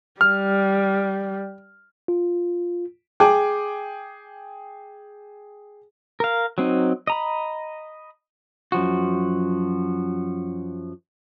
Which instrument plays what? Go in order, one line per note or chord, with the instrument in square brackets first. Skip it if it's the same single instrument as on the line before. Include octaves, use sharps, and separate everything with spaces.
[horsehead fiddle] G3 [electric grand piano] F6
[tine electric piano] F4
[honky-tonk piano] G#4 G5 D6
[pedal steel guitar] A#4 F5
F#3 C4 D#4
D#5 A#5 B5
[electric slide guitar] F#2 F3 F#4